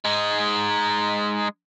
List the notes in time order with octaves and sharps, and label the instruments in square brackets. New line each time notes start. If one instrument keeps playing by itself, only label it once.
[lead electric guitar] G#3 D#4